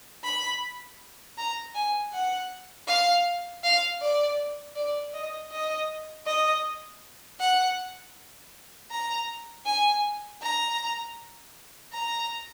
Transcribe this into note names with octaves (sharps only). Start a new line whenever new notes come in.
B5
A#5
G#5
F#5
F5
F5
D5
D5
D#5
D#5
D#5
F#5
A#5
G#5
A#5
A#5